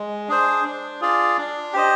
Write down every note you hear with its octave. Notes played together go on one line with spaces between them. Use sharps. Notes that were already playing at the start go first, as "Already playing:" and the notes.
Already playing: G#3
D4 G#4 C5
D4
F4 G#4 D5
D4
G4 C5 D#5